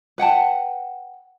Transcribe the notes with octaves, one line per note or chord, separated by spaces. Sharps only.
B4 F#5 G5 A5